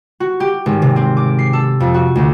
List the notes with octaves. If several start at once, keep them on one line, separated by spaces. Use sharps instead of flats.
F#4
G4
G#1
C3
C4
D6
C7
A4
F2
F#4
D2